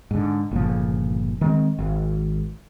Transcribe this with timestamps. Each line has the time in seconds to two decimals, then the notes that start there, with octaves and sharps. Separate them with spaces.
0.11 G#2 D3
0.51 G1 A#2 C#3 F3
1.41 D#3 G#3 C4
1.79 G#1